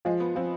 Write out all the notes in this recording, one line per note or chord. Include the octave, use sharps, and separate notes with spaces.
F3 G#3
B3
F3 C4